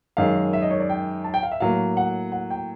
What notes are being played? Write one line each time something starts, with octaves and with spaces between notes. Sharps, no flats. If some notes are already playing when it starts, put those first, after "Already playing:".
F#2 D#3 G#3 F5
E5
D#5
C#5
D5
G5
A5
G5
F5
E5
A2 F#3 A#3 F5
F#5
F#5
G5